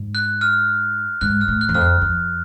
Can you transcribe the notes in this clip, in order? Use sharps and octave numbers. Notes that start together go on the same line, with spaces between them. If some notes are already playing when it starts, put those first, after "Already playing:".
Already playing: G#2
F#6
F6
G#2 F#6
F6
A2
F#6
E2
F2 F6
F#6
F2